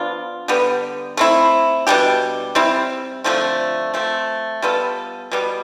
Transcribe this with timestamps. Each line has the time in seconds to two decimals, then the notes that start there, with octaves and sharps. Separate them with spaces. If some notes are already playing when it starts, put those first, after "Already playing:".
Already playing: F3 B3 D4 F4
0.48 D3 G3 B3
1.17 A3 C4 E4
1.87 B2 G3 D4 G4
2.55 G3 C4 E4
3.24 D3 F3 A3 C4
3.94 F3 A3 C4
4.62 G3 B3 F4 A4
5.32 B2 G3 B3